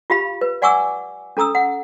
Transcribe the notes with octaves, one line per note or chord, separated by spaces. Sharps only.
F4 G4 F5 B5
B4
D5 F#5 G#5 C#6 D6 E6
C#4 A4 A#5 D#6 E6
F#5